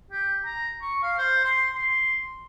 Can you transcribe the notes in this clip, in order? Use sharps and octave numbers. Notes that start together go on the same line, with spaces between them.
G4
A#5
C#6
F5
C5
C6
C6